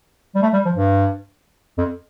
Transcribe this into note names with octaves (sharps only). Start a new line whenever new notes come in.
G3
A3
G3
F3
G2
F2